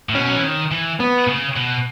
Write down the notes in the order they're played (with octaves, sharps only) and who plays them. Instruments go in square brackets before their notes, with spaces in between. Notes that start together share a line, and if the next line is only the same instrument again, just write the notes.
[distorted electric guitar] A2
[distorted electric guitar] B2 [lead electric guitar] C#4
[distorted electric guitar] F#3
E3
D#3
E3
[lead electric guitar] B3
[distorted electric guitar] C#3
B2